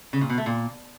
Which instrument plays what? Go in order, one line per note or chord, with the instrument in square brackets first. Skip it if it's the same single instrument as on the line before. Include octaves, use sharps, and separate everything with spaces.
[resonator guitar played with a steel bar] C#3
A#2
B2
A3
A#2